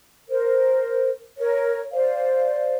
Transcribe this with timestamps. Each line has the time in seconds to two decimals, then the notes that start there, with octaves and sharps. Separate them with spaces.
0.30 A#4 C5
1.38 A#4 C#5
1.92 C5 D5 F5